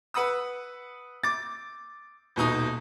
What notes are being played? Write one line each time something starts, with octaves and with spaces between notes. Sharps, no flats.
B4 F#5 B5 D#6 E6
D6 A6
D#1 B2 D#4 D#6